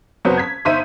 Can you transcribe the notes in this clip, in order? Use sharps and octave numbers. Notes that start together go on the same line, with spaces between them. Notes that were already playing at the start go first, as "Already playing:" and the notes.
F#1 F#3 B3 C4
G#6 B6
G1 D#4 C5 E5 B6 D#7